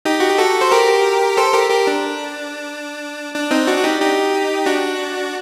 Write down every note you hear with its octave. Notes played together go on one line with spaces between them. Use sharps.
D#4 G4
F#4
G4
F#4 A4
C5
G4 A#4
A4 C5
G4 A#4
G4 A#4
D4
D4
C4 D#4
D4 F#4
F#4
D#4 G4
D#4 G4
D4 F#4